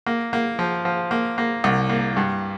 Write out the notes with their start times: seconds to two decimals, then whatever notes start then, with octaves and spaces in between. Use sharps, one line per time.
0.06 A#3
0.33 A#3
0.59 F3
0.85 F3
1.11 A#3
1.38 A#3
1.64 C2
1.90 A#3
2.17 G2